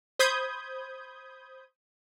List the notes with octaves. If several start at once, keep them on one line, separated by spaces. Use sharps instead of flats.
C5 B5 D#6 G6 G#6